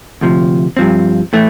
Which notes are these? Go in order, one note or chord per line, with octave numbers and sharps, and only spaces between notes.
D2 C3 F3
G2 F3 C4
A2 E3 A3